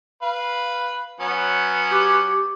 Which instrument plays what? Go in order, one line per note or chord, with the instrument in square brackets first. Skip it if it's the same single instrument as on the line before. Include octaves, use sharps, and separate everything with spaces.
[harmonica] B4 F5
F#3 B3 C#4
[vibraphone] G4 D6